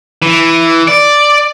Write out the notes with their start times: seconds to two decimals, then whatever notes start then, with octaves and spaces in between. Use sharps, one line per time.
0.22 E3
0.88 D5